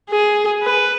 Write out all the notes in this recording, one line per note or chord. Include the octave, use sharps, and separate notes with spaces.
G#4
B4